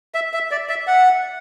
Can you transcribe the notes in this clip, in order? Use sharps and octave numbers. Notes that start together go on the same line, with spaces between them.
E5
E5
D5
E5
F#5